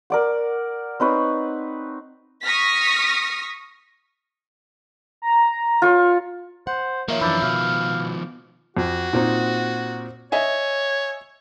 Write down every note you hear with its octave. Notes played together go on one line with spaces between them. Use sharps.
A#4 D5 F#5
C4 D#4 B4 C#5
C#6 D#6 F6 A#6 B6
A#5
F4 C#5
C5 F#5
D#3 F3 A#3 C#5 E5 A#5
F#2 E3 D4 B5 E6 G6
B2 F5
F2 F#4
A#2 C4 D#4
C#5 D#5 E5 G#5